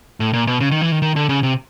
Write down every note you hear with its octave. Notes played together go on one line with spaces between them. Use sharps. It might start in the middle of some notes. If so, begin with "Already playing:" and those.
A2
A#2
B2
C#3
D#3
E3
D#3
D#3
D3
C#3
C3